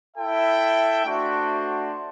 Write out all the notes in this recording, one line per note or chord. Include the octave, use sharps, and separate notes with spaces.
E4 A4 E5 G5
A3 D4 F#4 C5